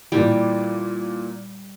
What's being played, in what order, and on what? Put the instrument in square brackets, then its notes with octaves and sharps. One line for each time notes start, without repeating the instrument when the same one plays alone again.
[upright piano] A#2 E3 [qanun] G3